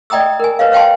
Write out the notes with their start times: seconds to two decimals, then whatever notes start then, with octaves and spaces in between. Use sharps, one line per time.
0.10 D5 D#5 G5 A#5 D#6 E6
0.40 A#4 G#5
0.59 B4 C#5 D#5 F5
0.72 C#5 F5 G5 A5 C6